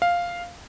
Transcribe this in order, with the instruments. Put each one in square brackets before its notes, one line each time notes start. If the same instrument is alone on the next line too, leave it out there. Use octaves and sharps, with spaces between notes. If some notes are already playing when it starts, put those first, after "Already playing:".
[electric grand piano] F5